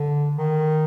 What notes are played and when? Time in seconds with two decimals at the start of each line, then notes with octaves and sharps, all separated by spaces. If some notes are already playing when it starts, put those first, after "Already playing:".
Already playing: D3
0.38 D#3